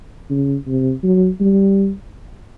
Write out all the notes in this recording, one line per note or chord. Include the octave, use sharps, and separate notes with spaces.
C#3
C3
F#3
G3